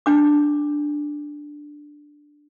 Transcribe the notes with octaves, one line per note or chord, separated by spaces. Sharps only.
D4 D6